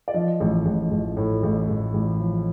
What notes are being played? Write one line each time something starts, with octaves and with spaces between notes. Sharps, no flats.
D5
F3 D#5
A1
A1
A1
A2
A1
A1
A1
F3